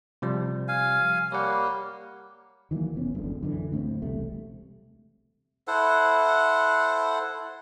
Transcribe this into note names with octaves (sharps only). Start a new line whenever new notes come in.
C3 F3 G3
F5 G#5
G3 A#3 C#5 F#5
D#3 E3 F#3 A#3
F1 B3 C#4
F#1 C#2 D3
F#2 D3 E3
D2 A2 B3 C4
E1 C2 C3 A3
E4 A4 C5 F#5